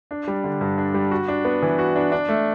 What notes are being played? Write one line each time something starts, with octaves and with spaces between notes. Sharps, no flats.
D4
G3
D3
G2
D4
G3
F#4
D4
B3
E3
F#4
D4
D4
A3